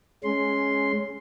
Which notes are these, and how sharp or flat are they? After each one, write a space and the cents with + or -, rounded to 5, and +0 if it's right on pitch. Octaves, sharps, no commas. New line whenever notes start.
G#3 +15 C#4 +0 C6 +0